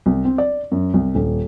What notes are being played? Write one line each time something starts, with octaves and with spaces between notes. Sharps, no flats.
C2
C4
D5
F#2
C2
D#1